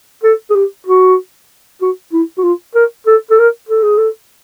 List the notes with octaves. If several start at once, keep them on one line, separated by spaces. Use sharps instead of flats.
A4
G#4
G4
F#4
F#4
E4
F#4
F4
A#4
A4
A4
A#4
A4
G#4
A4